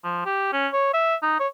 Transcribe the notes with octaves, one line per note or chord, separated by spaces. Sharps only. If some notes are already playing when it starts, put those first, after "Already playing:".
F3
G4
C#4
C#5
E5
D#4
C#5